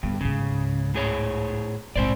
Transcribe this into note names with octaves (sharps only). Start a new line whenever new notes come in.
G2 D3 B3
C#2 G#2 C#3
A2 G#4 C#5
A#1 G#2 C4 C5 D5